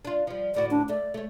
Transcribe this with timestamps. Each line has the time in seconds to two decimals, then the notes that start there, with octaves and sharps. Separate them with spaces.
0.05 D4 F4
0.27 F3 G3
0.55 D2 A2 F#4 D5
0.71 D4
0.89 A3 D5
1.14 A3 C#5